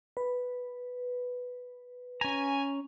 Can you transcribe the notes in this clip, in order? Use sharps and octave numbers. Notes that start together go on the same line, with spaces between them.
B4
C#4 G#5 A#5